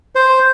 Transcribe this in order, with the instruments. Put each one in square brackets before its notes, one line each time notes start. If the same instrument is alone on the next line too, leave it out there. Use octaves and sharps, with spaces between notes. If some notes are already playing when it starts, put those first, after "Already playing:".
[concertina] C5